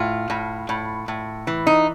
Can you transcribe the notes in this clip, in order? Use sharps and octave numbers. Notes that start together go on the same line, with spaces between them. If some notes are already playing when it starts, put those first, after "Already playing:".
Already playing: A2 F4
A2
A2
A2
E3
D#4